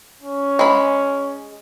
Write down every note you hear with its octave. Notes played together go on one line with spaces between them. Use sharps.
C#4
G#3 B5